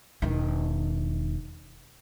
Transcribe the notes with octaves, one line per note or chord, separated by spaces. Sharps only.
E1 D#3